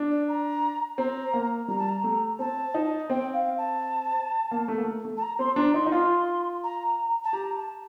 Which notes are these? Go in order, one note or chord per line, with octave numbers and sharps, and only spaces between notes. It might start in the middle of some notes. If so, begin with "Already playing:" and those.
Already playing: D4
D5
A#5
C4 A#5
A#3
G3 A#5
A5
A#5
A3
C4 A5
D#4
C4 G5
F5
A5
A#3
A3
A#3
A3
A3
A5
A#5
C4 C6
D4 A#5
D#4 C6
D#4
F4 C6
A#5
A5
G4 A#5
A5